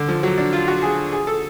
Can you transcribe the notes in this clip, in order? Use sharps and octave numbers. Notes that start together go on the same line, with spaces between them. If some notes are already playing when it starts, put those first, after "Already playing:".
Already playing: D3
F3
F#3
D4
F4
F#4
G#4
G#4
A4